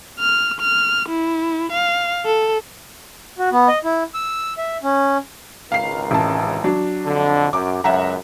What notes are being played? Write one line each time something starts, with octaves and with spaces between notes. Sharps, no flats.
F6
F6
E4
F5
A4
F#4
B3
D#5
E4
E6
E5
C#4
G#1 C#2 A#4 F5 C7
A1 A5
F#3 D4
F2 D3
F#2 D6
C#2 F#2 E5 F#5 A#5